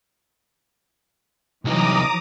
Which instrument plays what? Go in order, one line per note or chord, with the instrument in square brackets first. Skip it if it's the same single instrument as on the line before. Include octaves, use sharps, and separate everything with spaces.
[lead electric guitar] C2 D#4 [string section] E3 F#3 [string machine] A#5 D6 D#6